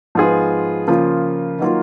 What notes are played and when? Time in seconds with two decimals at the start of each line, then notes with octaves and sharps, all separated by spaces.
0.15 G#2 F3 B3 F4 G#4
0.87 C#3 F3 A#3 F4
1.59 D#3 F#3 A#3 F4